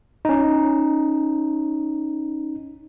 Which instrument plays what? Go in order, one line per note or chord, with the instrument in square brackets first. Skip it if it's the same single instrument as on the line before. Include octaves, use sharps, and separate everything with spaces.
[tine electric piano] C#4 D#4